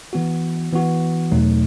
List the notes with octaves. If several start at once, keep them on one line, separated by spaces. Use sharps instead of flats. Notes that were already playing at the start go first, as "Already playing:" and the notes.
E3 B3 F#4
E3 B3 F#4
E2 B2 F#3 A3 D#4